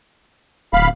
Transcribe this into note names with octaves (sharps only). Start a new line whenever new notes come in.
D1 F5 B5